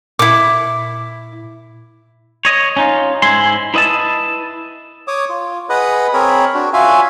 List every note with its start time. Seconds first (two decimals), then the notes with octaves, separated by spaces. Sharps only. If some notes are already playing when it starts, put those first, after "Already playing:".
0.19 A#2 E4 D6
2.45 C#5 D#5
2.76 C#4 D#4 F4
3.22 G#2 G#3 E4 G#5 C6
3.74 E4 B4 D#5 E5 A5
5.08 C#5 D6 D#6
5.29 F4
5.70 G#4 B4 D#5 F#5 B5 D#6
6.14 C4 G#4 A#4 C#5 B5
6.54 D4 F#4
6.73 C#4 F4 F#4 E5 F5 G#5